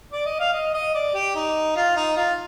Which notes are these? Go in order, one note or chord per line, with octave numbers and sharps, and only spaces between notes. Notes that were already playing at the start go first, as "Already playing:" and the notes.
D5
D#5
F5
D#5
D#5
D5
G4
D#4
F4
D#4
F4